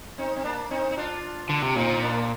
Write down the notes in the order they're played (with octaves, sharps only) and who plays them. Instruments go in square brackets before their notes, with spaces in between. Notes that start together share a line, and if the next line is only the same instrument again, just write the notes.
[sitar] C4 D#4
C4
A#3 D4
C4 D#4
D#4
D4 F4
[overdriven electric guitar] D3
C3
[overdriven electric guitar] A#2 [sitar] C4 D#4
[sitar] D#4
A#3 D4